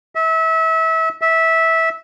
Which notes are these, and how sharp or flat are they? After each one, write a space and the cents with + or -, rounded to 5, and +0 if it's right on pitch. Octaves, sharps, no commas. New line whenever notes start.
E5 -30
E5 -15